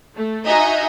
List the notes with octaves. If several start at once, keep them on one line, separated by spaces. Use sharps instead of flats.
A3
D#4 F#4 D#5 E5 G#5 A#5